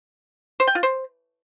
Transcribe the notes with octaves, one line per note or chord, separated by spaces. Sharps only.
C5
G5
F4
C5